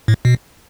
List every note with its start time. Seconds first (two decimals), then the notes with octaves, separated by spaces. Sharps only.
0.08 A2
0.25 B2